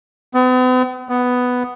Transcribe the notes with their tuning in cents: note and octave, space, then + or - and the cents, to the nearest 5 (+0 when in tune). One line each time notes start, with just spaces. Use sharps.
B3 +45
B3 +5